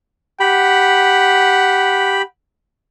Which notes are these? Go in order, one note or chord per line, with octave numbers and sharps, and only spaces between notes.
G4 F#5 B5